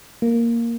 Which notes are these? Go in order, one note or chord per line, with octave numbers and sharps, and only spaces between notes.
A#3